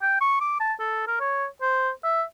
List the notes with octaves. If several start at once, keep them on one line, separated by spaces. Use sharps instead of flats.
G5
C#6
D6
A5
A4
A#4
C#5
C5
E5